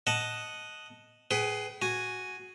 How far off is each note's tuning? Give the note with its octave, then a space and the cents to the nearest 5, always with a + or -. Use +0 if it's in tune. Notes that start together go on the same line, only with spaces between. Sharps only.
D#5 +0 F#5 +0 A5 -5
G#4 +10 B4 +10 G5 -40
F#4 +0 G#5 +0